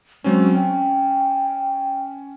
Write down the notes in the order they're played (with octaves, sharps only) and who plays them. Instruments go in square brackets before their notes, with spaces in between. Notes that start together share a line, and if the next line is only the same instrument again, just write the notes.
[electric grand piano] F#3 C4 C#4 [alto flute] G#3
[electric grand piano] C#4 [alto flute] G5